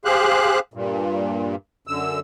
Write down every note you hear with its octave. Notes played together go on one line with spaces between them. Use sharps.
G4 G#4 C5 F5 F#6
G2 A#2
F#2 D3 E6